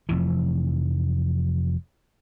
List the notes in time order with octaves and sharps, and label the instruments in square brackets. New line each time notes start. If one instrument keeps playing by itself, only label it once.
[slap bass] F1 F2 E3